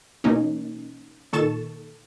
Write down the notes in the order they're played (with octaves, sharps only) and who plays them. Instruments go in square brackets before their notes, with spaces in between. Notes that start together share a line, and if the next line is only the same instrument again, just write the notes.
[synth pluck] B2 E3 A#3 C#4 D#4
A#2 D#3 A4 C#6 A6 E7